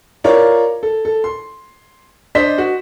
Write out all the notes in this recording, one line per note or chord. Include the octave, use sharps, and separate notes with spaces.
F4 A#4 C#5 D5
A4
A4
C6
D4 C5 D#5 B6
F#4